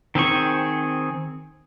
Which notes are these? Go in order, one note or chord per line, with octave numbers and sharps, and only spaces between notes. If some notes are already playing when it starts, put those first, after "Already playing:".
D#3 C4 G#4 C#6